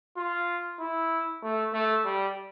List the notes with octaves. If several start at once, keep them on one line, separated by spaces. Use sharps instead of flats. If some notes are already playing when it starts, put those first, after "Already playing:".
F4
E4
A3
A3
G3